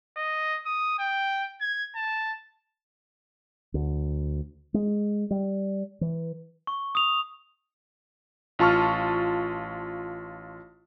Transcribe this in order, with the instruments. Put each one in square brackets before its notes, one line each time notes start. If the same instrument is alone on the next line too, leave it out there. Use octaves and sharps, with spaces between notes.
[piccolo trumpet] D#5
D#6
G5
G#6
A5
[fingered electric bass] D2
G#3
G3
E3
[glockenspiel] C#6
D#6 F7
[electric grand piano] A1 F4 A5 C#6 F6